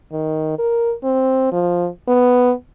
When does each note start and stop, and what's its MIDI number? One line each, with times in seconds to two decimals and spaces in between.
0.12 0.55 51
0.59 0.94 70
1.04 1.48 60
1.52 1.88 53
2.08 2.52 59